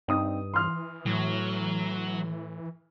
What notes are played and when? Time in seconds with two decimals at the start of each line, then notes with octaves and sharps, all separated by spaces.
0.08 G2 C4 D#4 D#6
0.54 E3 C6 D#6 F6
1.06 A2 F#3